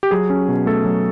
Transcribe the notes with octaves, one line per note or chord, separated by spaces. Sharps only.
G4
F#3 G#4
C#4
B2
A3 A4
F#3